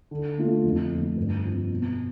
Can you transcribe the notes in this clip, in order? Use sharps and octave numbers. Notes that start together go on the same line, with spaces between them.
D3
A3 D4 F4
F2
D3 F3 A3
G2
F3 C4
B2